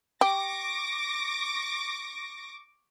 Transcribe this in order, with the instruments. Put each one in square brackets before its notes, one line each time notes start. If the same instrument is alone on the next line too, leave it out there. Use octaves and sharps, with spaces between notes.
[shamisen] G4 [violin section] C#6 D6 A#6